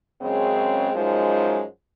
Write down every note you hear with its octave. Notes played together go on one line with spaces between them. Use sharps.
F#2 C#3 G#3 C4
F#2 F3 G#3 D#4